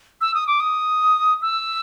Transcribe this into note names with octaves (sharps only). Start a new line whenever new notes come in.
E6
D#6
D6
D#6
E6